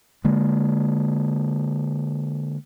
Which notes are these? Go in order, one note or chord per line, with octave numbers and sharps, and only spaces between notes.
D3 G#3 A#3